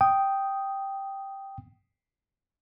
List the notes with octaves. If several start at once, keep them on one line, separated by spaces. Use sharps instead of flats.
G5 D#6